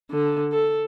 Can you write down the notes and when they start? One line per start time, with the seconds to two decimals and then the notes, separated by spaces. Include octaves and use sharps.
0.12 D3
0.53 A4